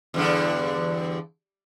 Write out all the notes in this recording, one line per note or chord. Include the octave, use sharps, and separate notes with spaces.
E2 G2 D3